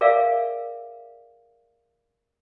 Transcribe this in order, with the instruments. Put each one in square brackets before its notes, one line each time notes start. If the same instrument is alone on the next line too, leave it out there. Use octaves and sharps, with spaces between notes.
[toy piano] G#4 A#4 D5 E5 F5